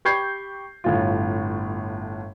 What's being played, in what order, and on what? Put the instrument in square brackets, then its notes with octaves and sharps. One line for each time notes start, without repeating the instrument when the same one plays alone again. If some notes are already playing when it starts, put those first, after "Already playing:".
[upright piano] G4 B5 C#6 G6 G#6 C7
G1 A2 F4